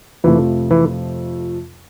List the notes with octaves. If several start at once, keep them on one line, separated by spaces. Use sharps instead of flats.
F2 C3 E3 F3 A3
E3